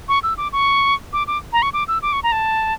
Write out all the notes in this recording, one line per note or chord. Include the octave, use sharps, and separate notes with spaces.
C#6
E6
D6
C#6
D6
D6
A#5
C#6
D6
E6
D6
C#6
A#5
A5